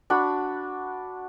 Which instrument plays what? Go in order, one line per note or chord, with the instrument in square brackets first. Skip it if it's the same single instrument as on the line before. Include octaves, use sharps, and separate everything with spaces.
[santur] D4 F#4 F#5 B5